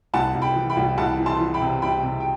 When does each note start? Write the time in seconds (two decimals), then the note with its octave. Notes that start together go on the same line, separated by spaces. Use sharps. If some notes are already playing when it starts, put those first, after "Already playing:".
0.14 C2 F#5 A5
0.34 C2
0.42 G5 B5
0.56 E3
0.70 G5 B5
0.77 C2
0.98 C2 F#5 A5
1.19 E3
1.26 A5 C6
1.40 E3
1.54 G5 B5
1.62 C3
1.82 C2 G5 B5
2.03 C3
2.20 G5